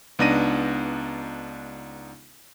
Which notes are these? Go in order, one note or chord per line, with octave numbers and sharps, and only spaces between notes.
C#2 B3 D4 D#4 A#6 D#7